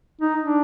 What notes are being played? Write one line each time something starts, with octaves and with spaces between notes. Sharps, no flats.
D#4
D4